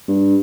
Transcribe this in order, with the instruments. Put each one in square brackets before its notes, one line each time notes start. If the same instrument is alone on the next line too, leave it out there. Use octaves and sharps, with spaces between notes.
[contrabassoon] G2